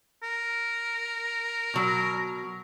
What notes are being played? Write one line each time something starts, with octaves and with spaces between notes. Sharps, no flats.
A#4
B2 F#3